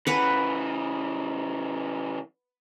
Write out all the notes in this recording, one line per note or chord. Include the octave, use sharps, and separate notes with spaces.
C#3 E3 B4 F#5